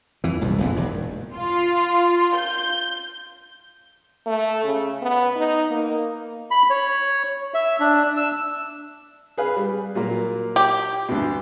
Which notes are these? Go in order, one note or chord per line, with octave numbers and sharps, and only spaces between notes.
F2 E3
D#1 C2 F2
E1 A#1 E3
E1 G2
F4
G6
A3
C#3
B3
D#4
A#3
B5
C#5
E5
D4
E6
G#4 B4 F5
G3
A#2 F#3 A#3
G4
D2 G2 B2